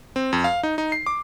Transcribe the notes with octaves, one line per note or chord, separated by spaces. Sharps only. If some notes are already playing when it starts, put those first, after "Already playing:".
C4
F2
F5
D#4
D#4
C7
D6